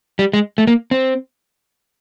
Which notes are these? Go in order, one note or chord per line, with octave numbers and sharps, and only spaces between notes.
G3
G#3
A3
A#3
C4